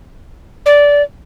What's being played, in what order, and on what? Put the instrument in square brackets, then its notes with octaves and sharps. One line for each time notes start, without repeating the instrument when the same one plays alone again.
[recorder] D5